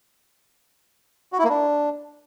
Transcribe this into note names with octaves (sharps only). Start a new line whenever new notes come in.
F#4
E4
A#3
D4